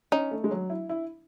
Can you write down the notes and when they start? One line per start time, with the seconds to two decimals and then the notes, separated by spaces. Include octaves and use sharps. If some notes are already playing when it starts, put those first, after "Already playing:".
0.12 C#4 D#4
0.31 A3
0.44 G#3
0.51 F#3
0.70 E4
0.89 E4